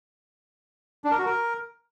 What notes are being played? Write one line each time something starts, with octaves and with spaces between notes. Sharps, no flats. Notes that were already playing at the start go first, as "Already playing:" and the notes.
D4
A#4
F#4
A#4